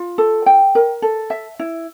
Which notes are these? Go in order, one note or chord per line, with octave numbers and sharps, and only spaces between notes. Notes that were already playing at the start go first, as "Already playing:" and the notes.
Already playing: F4
A4
G5
A#4
A4
E5
E4